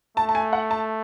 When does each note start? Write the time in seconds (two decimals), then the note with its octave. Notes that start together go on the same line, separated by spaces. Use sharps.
0.17 A3 A5
0.29 A5
0.35 G#5
0.53 F#5
0.71 A5